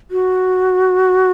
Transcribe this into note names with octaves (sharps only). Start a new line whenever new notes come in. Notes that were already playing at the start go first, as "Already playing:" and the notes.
F#4